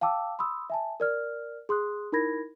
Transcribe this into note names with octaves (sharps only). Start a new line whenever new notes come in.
F5 G5 A5 D6 E6
B5 C6 D#6 E6
E5 G#5 A5
A#4 D5 F6
G#4 C6 D#6 F#6
D#4 E4 A#4 B5 G#6 A#6